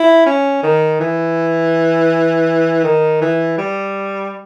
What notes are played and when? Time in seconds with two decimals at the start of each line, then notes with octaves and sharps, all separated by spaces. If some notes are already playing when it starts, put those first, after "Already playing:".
Already playing: E4
0.26 C#4
0.63 D#3
1.00 E3
2.84 D#3
3.21 E3
3.58 G3